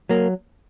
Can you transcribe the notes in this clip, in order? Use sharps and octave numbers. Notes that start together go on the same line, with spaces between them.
F#3 A#3